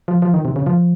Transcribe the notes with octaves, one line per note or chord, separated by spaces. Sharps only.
F3
F3
D#3
C3
C#3
F3